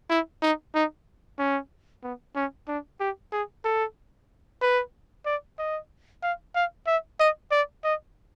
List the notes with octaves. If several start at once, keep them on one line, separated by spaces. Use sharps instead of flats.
E4
D#4
D#4
C#4
B3
C#4
D4
G4
G#4
A4
B4
D5
D#5
F5
F5
E5
D#5
D5
D#5